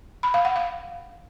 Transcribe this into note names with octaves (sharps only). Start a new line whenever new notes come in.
B5
F5
F#5
F5